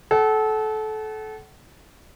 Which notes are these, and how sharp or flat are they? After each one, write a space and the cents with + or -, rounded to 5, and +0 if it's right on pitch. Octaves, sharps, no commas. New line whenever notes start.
A4 -25 F#5 +30